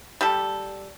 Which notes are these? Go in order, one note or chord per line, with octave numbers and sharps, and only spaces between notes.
G3 G4 A4